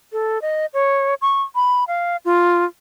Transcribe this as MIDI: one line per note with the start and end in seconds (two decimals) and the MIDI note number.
0.13 0.41 69
0.42 0.66 75
0.74 1.14 73
1.22 1.42 85
1.55 1.84 83
1.88 2.17 77
2.25 2.65 65